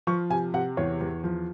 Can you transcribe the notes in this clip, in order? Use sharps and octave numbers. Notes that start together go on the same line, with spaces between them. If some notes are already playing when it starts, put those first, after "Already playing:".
F3 C#6
C3 G#5
C3 F#5
E2 C#5
E2
F3